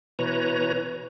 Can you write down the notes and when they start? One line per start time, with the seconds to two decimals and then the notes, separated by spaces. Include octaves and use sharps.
0.19 B2 E3 B4 C#5 A#5